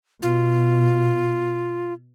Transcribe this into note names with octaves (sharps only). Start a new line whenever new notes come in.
B2 F4